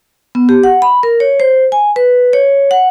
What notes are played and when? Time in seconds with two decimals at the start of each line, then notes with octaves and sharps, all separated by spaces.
0.35 B3
0.49 G4
0.64 F#5
0.82 B5
1.03 A#4
1.20 C#5
1.40 C5
1.72 G#5
1.96 B4
2.33 C#5
2.71 F#5